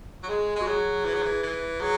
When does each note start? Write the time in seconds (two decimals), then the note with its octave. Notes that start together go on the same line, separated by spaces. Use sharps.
0.23 F#3
0.29 G#3 G#4
0.56 G#3 F#4
0.67 F#3 G#4
1.05 E3
1.14 F#3
1.23 E3
1.43 E3
1.81 F#3 G#4